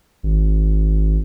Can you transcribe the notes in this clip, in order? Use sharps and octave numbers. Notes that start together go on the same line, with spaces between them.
G#1